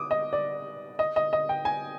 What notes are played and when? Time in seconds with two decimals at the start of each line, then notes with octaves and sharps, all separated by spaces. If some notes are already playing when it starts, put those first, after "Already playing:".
Already playing: D6 D#6
0.11 D#5
0.33 D5
0.99 D#5
1.16 D#5
1.33 D#5
1.49 G5
1.65 G#5